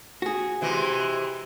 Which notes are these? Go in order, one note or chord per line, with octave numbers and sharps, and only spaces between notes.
F#4 G#4
C3 E3 G#3